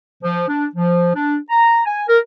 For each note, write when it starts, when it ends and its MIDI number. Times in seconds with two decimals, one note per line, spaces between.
0.23 0.45 53
0.49 0.65 62
0.75 1.11 53
1.15 1.37 62
1.50 1.82 82
1.86 2.03 80
2.09 2.18 70